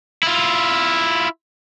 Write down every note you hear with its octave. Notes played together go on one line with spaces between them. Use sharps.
E4 F4